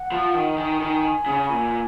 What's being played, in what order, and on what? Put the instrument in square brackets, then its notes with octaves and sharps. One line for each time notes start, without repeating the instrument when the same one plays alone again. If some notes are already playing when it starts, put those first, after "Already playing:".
Already playing: [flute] F#5
[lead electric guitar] F3
D#3
[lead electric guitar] D#3 [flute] G#5
[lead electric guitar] D#3
C#3
A#2